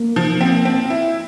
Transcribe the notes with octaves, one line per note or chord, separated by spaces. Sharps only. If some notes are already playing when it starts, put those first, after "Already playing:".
Already playing: A#3
F3
C4
C4
E4